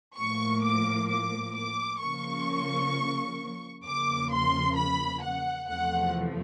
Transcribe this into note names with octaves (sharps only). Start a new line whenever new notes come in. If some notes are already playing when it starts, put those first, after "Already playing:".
A2 F3 A#3 C#6
D6
D6
D6
C#3 F3 A#3 C#6
E2 C#3 F3 A#3 D6
C6
B5
F#5
E2 C3 F3 A3 F#5